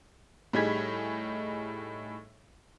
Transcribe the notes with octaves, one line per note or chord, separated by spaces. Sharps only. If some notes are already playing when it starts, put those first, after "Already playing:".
A2 G3 D#4 G#4 G#6 B6